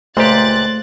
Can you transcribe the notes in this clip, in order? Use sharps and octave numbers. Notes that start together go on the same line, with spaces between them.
C#2 A#2 A3 G4 C5 F#6 A6